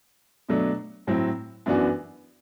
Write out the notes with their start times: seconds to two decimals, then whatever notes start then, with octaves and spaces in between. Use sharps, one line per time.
0.49 B2 F#3 A3 D4
1.07 A2 F#3 C4 E4
1.66 F#2 E3 B3 D4 F#4